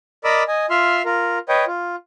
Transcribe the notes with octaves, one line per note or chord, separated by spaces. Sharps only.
A#4 D5 D#5 B5 D6 E6
D#5 G#5
F4 E5 C6 F6
F4 A#4
B4 C#5 D#5 G5
F4